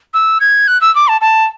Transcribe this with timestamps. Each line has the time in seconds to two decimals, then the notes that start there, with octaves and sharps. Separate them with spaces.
0.14 E6
0.40 G#6
0.68 F#6
0.81 E6
0.95 D6
1.08 A5
1.21 A5